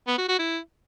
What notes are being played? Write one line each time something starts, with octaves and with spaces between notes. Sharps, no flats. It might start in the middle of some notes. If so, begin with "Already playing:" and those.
B3
F#4
F#4
E4